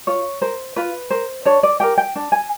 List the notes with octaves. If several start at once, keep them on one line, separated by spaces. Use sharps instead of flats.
F4 C#5
A#4 C5
F4 B4
A#4 C5
D4 C#5
D5
G4 A#4 G5
G5
D4
G#5